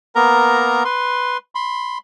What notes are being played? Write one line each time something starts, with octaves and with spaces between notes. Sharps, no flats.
A#3 B3 A#4 A#5
B4 C6
B5 C6